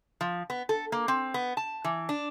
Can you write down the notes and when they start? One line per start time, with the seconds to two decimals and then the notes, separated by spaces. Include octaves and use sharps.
0.21 F3
0.50 B3
0.69 A4
0.92 A#3
1.08 C4
1.34 B3
1.57 A5
1.84 E3
2.09 D4